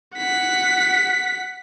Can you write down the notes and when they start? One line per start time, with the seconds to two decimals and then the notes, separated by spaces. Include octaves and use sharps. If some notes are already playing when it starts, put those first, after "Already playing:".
0.17 F#5 B6